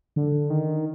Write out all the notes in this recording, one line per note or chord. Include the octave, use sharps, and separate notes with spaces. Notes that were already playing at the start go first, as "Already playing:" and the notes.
D3
D#3